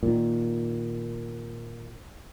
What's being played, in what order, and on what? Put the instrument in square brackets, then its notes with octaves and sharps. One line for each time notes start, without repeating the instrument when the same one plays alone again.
[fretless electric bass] A#2 D#3